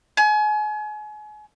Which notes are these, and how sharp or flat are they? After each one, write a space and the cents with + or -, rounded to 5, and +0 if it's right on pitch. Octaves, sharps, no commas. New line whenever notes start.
G#5 +35